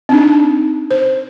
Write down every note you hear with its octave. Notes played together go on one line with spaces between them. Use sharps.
C4 D4 D#4
C5